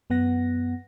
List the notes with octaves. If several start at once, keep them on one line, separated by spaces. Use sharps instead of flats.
F#2 B3 F#5 A#6